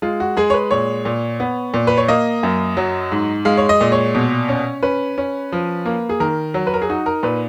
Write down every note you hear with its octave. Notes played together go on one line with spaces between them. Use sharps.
G#3 F4
F#4
G#3 G#4
C#5
B4
A#2 C#5
A#2
B3
A#2
B4
C#5
A#3 D#5
F#2
F#3
G#2
G#3 F5
C#5
D#5
A#2
C#5
B2
C#4
C#4 B4
C#4
F3
A#3
G#4
D#3 A#4
F#3
B4
A#4
G#4
D#4 F#4
A#4
A#2 B4